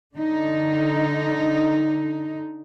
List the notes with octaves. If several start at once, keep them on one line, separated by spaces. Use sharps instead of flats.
D3 D#4